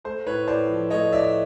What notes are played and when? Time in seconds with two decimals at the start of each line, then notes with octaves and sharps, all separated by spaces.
0.05 A3 C5
0.27 A2 B4 C#5
0.48 A2 C5 D5
0.69 F3
0.90 A3 C#5 D#5
1.12 A2 D5 E5